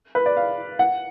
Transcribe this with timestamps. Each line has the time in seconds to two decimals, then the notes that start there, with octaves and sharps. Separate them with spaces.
0.15 B4
0.26 D5
0.37 F5
0.79 F#5